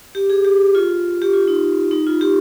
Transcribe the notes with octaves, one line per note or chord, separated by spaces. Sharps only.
G4
G#4
G4
F4
G4
F4
D#4
D#4
F4
G4